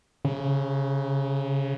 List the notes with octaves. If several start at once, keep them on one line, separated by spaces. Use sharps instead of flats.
C#3